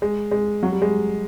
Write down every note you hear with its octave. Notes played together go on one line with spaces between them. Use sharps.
G#3
G#3
F#3
G3
G#3